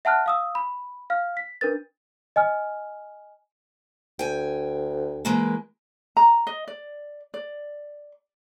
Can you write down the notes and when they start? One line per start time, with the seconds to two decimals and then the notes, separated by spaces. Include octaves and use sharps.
0.05 E5 F#5 A5 F6 F#6
0.26 F5 D#6 E6
0.55 B5
1.10 F5 F6
1.37 B6
1.61 D4 A#4 B4 A6
2.36 D#5 G#5 F6
4.19 D2 G5 G#5
5.25 E3 G#3 A#3
6.17 A#5
6.47 D#5
6.68 D5
7.34 D5